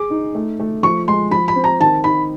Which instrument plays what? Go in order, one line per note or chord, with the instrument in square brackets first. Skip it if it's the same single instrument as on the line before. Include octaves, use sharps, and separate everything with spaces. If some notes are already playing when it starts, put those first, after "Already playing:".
Already playing: [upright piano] G#4 [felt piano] D6
[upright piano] D#4
A3
A3
[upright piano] F3 [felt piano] C#6
[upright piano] G#3 [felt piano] C6
[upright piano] F3 [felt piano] B5
[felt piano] B5
[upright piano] C4
[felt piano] A#5
[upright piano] D#3 [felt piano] A5
[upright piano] D#4 [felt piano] B5